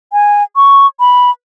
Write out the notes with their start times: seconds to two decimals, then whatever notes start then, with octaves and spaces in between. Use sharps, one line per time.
0.13 G#5
0.56 C#6
1.00 B5